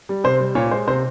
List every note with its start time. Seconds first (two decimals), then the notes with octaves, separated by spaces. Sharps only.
0.09 G3
0.24 C3 C5
0.40 G3
0.55 A#2 C#5
0.71 G#3 C5
0.87 C3 C5